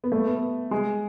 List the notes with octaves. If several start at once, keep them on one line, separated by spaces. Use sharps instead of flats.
B3
A3
B3
G#3